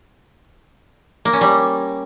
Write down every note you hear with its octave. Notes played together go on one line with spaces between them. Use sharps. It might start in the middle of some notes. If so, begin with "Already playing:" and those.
A#3
C#4
G3